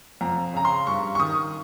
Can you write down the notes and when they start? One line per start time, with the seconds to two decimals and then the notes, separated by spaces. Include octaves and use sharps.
0.21 F2 A#5
0.54 C#3 A#5
0.65 C6
0.87 G2 C#6
1.15 C#6
1.19 D#3 D#6